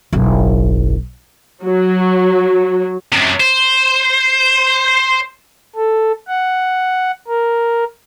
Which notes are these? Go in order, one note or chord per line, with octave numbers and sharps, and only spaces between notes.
F#1 B1
F#3
F#2 C3
C5
A4
F#5
A#4